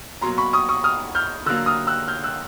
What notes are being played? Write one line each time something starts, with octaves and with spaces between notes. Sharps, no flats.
B2 F#3 A#3 A#5 C6
B5 C#6
C#6 D#6
C#6 D#6
D#6 F6
F6 G6
D3 F#3 A#3 E6 F#6
D#6 F6
E6 F#6
F6 G6
E6 F#6